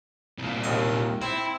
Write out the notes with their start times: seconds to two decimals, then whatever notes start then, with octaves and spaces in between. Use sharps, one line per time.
0.38 C2 A#2
0.64 D#2 D#5 G#5
1.22 C4 E4